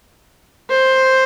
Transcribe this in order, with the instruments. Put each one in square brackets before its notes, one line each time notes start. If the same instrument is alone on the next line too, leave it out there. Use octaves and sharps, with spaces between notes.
[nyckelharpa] C5